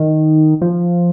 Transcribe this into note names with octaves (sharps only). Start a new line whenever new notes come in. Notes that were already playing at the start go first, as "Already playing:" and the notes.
Already playing: D#3
F3